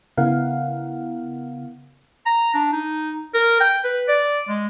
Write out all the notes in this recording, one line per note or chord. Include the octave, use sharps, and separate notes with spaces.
C#3 B3 E4 A#4 F5 F#5
A#5
D4
D#4
A#4
G5
B4
D5
G#3